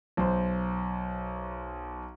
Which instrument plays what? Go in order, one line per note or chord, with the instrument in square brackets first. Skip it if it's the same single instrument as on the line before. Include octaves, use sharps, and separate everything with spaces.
[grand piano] B1 C5